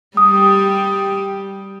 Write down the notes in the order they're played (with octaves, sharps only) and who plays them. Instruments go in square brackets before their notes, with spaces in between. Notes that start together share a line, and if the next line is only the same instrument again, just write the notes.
[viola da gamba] G3 G4 [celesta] D#6